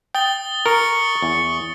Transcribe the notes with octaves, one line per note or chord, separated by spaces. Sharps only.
G5 D#6 A6 G7
A#4 C#6 C#7 G7
E2